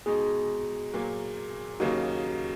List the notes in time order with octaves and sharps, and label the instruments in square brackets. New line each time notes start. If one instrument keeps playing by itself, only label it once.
[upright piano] B2 G#3 D#4 [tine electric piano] G#4
[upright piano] A#2 F#3 A#3
[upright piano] D#2 C#3 F#3 A#3 D#4 [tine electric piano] F#4